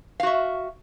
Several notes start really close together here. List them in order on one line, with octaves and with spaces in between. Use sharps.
F5 F#4 E5